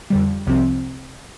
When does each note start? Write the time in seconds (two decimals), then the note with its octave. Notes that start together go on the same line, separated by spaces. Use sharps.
0.10 F2 D3 G3
0.46 C2 C3 F3 C4